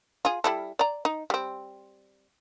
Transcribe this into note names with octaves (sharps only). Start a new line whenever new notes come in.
F4 G#4
G3 E4 A4
D5 A#5
D#4
G3 C4